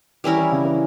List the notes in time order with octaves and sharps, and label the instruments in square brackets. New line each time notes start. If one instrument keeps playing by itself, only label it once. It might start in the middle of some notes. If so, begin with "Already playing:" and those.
[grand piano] E3 [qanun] G3 C#4 E4 A#4
[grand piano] E3
C#3
E3